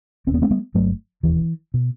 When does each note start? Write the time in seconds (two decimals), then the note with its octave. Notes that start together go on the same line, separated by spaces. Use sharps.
0.27 E1 D#2 C4
0.34 B3
0.42 A3 C4
0.51 G3 B3
0.74 G1 G2 F#3 A3
1.23 E1 D#2 E3
1.74 B2